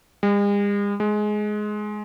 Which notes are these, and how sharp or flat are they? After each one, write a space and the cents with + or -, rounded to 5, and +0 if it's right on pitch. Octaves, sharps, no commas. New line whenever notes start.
G#3 -45
G#3 +15